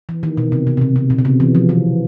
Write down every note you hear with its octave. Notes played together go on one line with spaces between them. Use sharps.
E3
D#3
B2
C3
C3
C3
B2
C3
B2
C#3
C3
E3
F3
E3